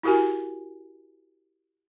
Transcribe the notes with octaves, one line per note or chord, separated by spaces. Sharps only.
E4 F#4 G4 A#4 G#5